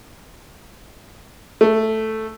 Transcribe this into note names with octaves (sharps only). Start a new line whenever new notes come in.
A3